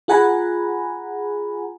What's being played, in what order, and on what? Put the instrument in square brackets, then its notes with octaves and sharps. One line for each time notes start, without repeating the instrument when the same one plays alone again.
[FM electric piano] F4 G#4 F#5 G#5 A#5 B5